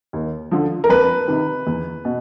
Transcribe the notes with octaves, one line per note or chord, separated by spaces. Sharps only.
D#2
D3 F3
A#4
F2 B4
C3 D#3
E2
B2